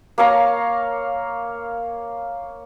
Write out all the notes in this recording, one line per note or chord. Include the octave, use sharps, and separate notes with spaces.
A#3 C#5 F5 A#5